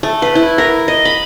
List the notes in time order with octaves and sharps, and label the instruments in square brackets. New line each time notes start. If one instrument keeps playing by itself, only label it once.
[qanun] A3
B4
E4
A#4
D#5
B5